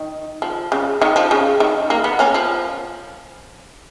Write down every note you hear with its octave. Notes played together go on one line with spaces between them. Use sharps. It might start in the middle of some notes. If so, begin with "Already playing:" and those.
Already playing: D#3
F3
C#3
D#3
F3
C#3
D#3
A#3
B3
A#3 C#4
F3